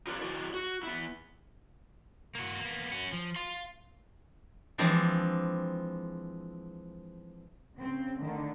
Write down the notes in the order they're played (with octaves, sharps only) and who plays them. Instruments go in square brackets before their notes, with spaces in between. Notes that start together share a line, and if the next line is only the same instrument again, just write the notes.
[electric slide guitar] F4 G4 A#4 B4 C#5 D5
E4 F#4 D5
F#4
B3 E4
[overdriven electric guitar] A#3 F#4
A#3 B3
C#4 F#4
F3
F5 C6
[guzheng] E3 F3 G#3 C4 D4 E4
[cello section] C#3 C4
D3 D#3 A3